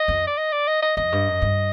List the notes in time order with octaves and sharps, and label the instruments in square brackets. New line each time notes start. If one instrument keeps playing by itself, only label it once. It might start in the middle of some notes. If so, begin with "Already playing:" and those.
Already playing: [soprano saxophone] D#5
[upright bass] F2
[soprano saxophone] D5
D#5
D5
D#5
D#5
[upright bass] F2 [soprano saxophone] D#5
[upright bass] G2
F#2
G2